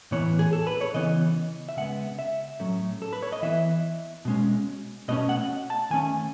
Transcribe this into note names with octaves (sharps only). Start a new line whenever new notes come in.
A2 E3 B3 C#5
G#4
A4
B4
C#5
C#3 E3 B3 D#5
E5
C#3 G#3 B3 F#5
E5
A2 F#3 A3 C#4
A4
B4
C#5
D#5
E3 B3 E5
B2 G#3 C#4
B2 A3 C#4 D#5
F#5
A5
D#3 A3 C#4 G#5